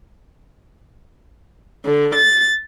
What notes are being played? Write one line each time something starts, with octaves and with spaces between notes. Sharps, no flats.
D3
A6